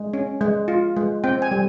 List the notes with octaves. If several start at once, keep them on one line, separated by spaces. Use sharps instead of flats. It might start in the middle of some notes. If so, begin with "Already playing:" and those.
Already playing: G#3
C#4
G#3
F4
G#3
C4 G5
G#5
G3